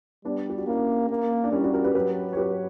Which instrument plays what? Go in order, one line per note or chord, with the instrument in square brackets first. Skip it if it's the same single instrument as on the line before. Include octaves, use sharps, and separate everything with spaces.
[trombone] G3 [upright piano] B3 D4
[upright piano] G4
F#4
[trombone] A#3 [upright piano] C#4 E4
[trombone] A#3
[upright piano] D4
[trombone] G3 [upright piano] C#4 E4
[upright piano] D4 F#4
F#4 A#4
G4 B4
[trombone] F#3 [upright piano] G4 B4
[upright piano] C#5
[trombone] F#3 [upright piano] G4 B4